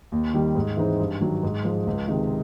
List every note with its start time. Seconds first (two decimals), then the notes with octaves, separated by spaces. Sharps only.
0.12 D#2
0.34 D#3 G3
0.55 G#2
0.77 E3 G#3 C4 D#4
0.99 G2
1.21 D#3 F#3
1.43 G#2
1.65 F3 G#3
1.87 C#2
2.08 C3 D#3 G#3